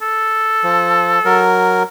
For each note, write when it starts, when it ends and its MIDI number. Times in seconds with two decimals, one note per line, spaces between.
0.02 1.45 69
0.64 1.19 53
1.25 1.83 54
1.25 1.83 70